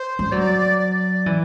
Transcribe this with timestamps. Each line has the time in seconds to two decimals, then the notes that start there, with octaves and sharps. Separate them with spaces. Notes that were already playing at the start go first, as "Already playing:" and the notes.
Already playing: C5
0.19 G3
0.32 F#3 D5
0.79 D5
1.26 E3